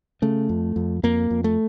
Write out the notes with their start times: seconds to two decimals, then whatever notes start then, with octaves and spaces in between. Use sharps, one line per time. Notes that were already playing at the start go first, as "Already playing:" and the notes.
0.22 C#3 A3
0.49 F2
0.76 F2
1.03 F2 A#3
1.30 F2
1.44 A3